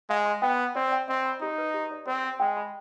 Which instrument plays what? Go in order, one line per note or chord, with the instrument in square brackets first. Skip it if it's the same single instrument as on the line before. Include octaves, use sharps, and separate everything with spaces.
[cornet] G#3 [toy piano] F5
[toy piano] C6
[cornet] B3 [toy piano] G5
[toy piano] B5
[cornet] C4 [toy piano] D5
[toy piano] G5
[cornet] C4 [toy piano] D#5
[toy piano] B5
[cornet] D#4 [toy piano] G4
[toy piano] B4
G4
D5
[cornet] C4 [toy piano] C5
[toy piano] G5
[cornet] G#3 [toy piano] G5
[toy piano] B5